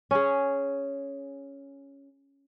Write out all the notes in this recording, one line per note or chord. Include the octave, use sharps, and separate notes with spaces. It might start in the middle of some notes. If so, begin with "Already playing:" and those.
C#4 G#4